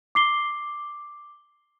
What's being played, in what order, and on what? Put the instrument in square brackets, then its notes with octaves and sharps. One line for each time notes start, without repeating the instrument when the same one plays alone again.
[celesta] D6 C7 G7